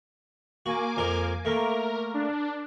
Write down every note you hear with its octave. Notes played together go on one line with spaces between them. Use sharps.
A#3 F#4 G#5 D6
F2 A#4
A3 A#3 A#4
D4